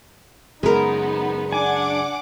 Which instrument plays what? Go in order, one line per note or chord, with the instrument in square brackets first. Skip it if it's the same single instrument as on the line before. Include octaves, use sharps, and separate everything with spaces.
[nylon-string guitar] F#2 C#3 G#3 [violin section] B3 D#4 [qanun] A#4 B4
[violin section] D4 F#5 D6 [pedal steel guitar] G#5